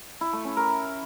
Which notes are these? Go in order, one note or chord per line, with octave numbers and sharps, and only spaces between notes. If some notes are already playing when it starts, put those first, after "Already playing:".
E4
A3
C#4
A#4